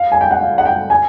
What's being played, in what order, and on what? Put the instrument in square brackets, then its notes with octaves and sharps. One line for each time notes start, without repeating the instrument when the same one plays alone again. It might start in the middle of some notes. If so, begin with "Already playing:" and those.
Already playing: [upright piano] F5
G#5
G5
F#5
F5
F#5
G5
G#5